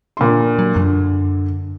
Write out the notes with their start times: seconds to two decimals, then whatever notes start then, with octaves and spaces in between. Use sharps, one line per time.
0.17 A#2 D3 C6
0.59 F#3
0.76 F#2 D3